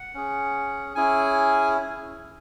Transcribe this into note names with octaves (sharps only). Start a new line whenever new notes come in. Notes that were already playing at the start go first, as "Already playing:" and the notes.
Already playing: F#5
C#4 G#4
C#4 E4 G#4 G#5